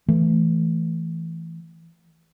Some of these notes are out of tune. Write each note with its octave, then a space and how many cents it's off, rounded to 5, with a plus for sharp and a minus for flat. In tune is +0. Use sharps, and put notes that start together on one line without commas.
E3 +5 A3 +0